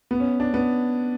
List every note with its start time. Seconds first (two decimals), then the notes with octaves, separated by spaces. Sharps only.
0.11 B3
0.20 C#4
0.40 D4
0.54 B3